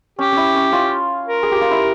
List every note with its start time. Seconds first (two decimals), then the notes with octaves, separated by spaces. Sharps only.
0.19 C#4 G4
0.32 C#4 E4
0.55 C#4
0.72 C#4 F4
1.27 A#4
1.43 G#4
1.51 G4
1.61 F4
1.71 E4